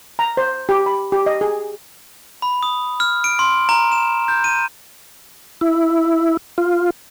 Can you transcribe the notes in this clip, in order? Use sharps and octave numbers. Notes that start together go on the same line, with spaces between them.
A#5
C5
G4
B5
G4
D#5
G#4
B5
D#6
F6
D7
C6
A#5
E7
G6
D#7
E4
F4